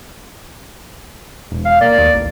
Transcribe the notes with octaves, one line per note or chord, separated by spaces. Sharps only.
E1
F5
A#3 D5
D#2
A1